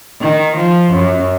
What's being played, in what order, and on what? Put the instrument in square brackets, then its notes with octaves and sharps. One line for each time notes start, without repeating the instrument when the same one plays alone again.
[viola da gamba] D#3
F3
F#2